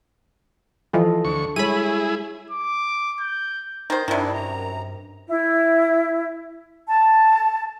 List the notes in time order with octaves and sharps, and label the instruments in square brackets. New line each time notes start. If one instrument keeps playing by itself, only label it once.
[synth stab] E3 F3 [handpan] A4 D#5
[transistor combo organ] D2 C#6
[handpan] G3 G#3 C#5 [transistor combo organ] E4 G#4 [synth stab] B5 D#7
[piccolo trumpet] D6
G6
[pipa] D#3 C5 [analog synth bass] D#4
[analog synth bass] G2 [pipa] C3 D#3 [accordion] D4 E4
[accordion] F#2 A#5
[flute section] E4
A5